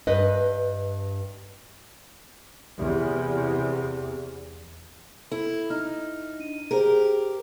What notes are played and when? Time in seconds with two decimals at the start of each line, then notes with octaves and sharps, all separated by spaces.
0.07 G2 B4 D#5
2.77 E2 C3
5.32 E4 A4
5.70 D#4 F6
6.40 D4 D#7
6.71 G4 G#4 A#4 C5